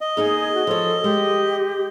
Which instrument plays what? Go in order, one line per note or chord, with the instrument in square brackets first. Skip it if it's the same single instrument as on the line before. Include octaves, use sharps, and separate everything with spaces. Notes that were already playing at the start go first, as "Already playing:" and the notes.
[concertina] D#5
[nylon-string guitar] A#3 D#4 A#4 [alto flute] G#4
[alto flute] F#4
[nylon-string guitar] F3 C#5 [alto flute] A4
[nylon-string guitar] G#3 [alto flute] G4